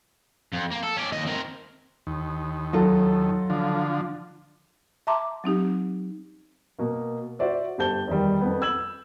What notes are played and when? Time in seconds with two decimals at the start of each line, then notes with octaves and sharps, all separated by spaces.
0.53 F2
0.72 A#3
0.84 A4
0.97 C#4 D5
1.12 D#2 D#5
1.26 C4 A#4
2.07 D#2
2.73 F#3 F4 A4
3.50 D3 F3
5.07 E5 A5 A#5 C6 D6
5.44 F#3 C4 D#4 G4
6.79 B2 A#3
7.39 F#4 C5 D5 E5
7.78 G1 G4 C5 A5 G6 G7
8.08 E2 D#3 G3
8.41 F2 B3
8.62 E6 G#6 E7 F#7